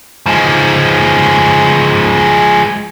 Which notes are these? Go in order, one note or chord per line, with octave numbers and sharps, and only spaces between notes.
F3 G#3